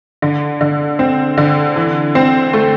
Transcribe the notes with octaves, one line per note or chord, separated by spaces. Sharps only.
D3
D3
C4
D3
E3
C4
A3